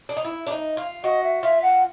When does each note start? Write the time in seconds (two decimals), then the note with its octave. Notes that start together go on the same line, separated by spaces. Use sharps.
0.09 D4
0.17 D#4
0.25 E4
0.47 D4
0.51 D#4
0.77 F4
1.04 F#4 D#5
1.23 E5
1.43 F4 E5
1.62 F#5